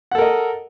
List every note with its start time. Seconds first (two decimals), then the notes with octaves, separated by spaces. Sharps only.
0.11 F#5
0.15 A4
0.18 A#4
0.22 D#5